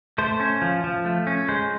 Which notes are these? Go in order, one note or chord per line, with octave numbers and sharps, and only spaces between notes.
A3 C5
C#4
F3
F3
A3
C#4
G#3 C5